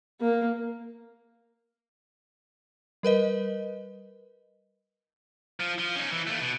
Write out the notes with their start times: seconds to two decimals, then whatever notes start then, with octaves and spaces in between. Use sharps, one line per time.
0.21 A#3
3.03 G3 A#4 B4 D#5
5.60 F3
5.79 F3
5.96 C#4 D#4
6.11 E3
6.27 D#2 A3
6.41 B2